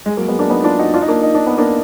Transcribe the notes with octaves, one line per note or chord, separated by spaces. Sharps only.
G#3
F#3 A#3
G#3 B3
A#3 D4
B3 D#4
D4 F4
D#4 F#4
D4 F4
D#4
A#3 D4
D#4
D4
B3
A#3 D4